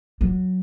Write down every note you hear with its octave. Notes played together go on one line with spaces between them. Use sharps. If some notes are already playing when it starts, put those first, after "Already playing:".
F#3